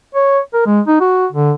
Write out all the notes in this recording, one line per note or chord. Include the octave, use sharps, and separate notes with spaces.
C#5
A#4
G#3
D#4
F#4
D3